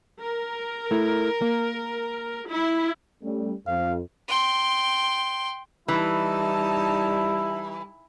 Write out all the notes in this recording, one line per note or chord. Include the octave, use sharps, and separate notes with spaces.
A#4
A3 E4
A#3
E4
G3 A3 C#4
F2 F5
G5 C6
E3 G3 D#4 E4 A5